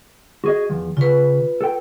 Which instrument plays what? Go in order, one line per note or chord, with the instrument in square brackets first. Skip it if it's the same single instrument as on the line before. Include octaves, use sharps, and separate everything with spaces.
[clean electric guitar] F#4 G#4 D#5
E2 F3
[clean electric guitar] C#3 [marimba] F4 B4
[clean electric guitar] A4 G5